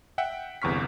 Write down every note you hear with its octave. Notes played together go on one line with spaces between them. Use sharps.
E5 F#5 G5
G1 E2 C3 C#6 F6 B6